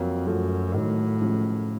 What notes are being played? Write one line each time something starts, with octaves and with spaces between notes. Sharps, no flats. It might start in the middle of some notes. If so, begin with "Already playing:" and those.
Already playing: F2 F#3 A#3
F#2 F3 A3
A2 D#3 F#3
C#3 F3